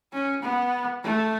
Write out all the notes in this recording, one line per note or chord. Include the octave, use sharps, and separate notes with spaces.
C#4
B3
A3